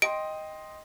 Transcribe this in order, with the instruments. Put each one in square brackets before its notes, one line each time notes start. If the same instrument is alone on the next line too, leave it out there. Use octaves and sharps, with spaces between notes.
[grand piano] D#5 G5 C6 [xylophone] D7